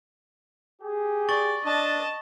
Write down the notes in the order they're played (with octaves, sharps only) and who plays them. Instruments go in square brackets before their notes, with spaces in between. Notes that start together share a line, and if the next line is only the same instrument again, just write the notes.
[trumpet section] G4 G#4
[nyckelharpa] D5 [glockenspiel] C#6 A6 F#7
[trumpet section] D4 [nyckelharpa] D#5 A5